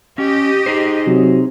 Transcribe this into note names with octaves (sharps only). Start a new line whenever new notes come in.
C#4 G4 D#5
D#4 G#4 C5
C3 F#3